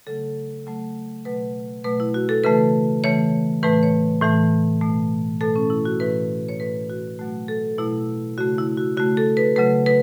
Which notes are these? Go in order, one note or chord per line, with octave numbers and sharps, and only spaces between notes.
C#3 F#3 A3 A4
C#3 F#3 A3
B2 F#3 A3 B4
B2 F#3 A3 B4
E4
F#4
A4
C#3 E3 A3 B4
C#3 E3 A3 C#5
A2 E3 A3 B4
C#5
A2 E3 A3
B2 A3
B2 A3 A4
C#4
E4
F#4
A2 E3 A3 B4
C#5
A2 E3 A3 B4
F#4
B2 F#3 A3 F#4
A4
B2 F#3 A3 E4
C#3 A3 F#4
E4
F#4
C#3 A3 F#4
A4
B4
C#3 F#3 A3 B4
B4